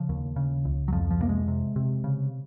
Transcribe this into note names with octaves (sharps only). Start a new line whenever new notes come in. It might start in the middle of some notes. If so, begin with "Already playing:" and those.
Already playing: C#3 F3
D#2
C#3
C#2
F#3
F2 F3
F3
C3 A#3
G#3
C3
C3
C#3